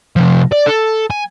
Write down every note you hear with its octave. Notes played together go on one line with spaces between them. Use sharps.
C3 F3
D5
A4
G#5